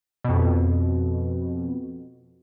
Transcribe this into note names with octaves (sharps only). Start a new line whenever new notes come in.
F2 B2